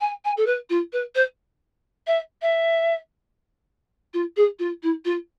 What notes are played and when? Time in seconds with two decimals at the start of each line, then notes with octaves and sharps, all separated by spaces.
0.01 G#5
0.25 G#5
0.37 A4
0.46 B4
0.70 F4
0.93 B4
1.15 C5
2.07 E5
2.42 E5
4.14 F4
4.37 G#4
4.59 F4
4.83 E4
5.05 F4